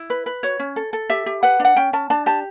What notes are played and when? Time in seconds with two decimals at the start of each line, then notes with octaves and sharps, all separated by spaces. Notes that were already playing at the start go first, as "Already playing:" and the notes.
Already playing: E4
0.10 B4
0.26 B4
0.43 F#4 C#5
0.59 C#4
0.76 A4
0.93 A4
1.10 G4 E5
1.26 G4
1.43 B4 F#5
1.60 D4
1.65 F#5
1.76 C#4 G5
1.93 C#4 A5
2.10 D4 A5
2.26 G4 A5